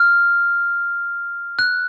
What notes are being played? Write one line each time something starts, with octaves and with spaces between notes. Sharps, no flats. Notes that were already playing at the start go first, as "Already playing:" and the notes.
Already playing: F6
F#6